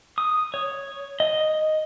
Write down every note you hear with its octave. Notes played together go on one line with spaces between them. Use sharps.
D#6
C#5
D#5